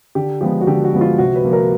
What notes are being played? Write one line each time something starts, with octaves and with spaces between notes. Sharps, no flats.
D3 G4
F3 G#3 B3 G4
F#4
D3 G4
F#4
F3 G#3 B3
F4
C3 F#4
B4
F3 A#3
A#4